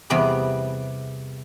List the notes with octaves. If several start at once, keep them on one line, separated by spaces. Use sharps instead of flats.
E2 C3 G3 B3 G#4 B5